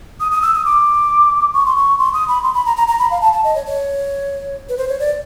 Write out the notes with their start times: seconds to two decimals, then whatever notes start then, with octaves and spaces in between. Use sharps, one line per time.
0.20 D#6
0.31 D#6
0.42 E6
0.54 D#6
0.65 D6
1.54 C#6
1.66 C6
1.77 C#6
1.99 C6
2.13 D#6
2.28 B5
2.43 C6
2.54 B5
2.66 A#5
2.77 A#5
2.88 A#5
2.99 B5
3.11 F5
3.21 A5
3.33 A5
3.44 D#5
3.55 C#5
3.66 C#5
4.69 B4
4.77 C5
4.89 C#5
5.00 D5